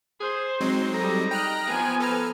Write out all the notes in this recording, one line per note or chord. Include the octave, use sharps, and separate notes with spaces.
G#4 C5
F#3 G#3 C4 D#4
G3 D#4 A4 A#5
D#5 G5 F6 F#6
F3 B3 G#5
A4 B4 A#5 F6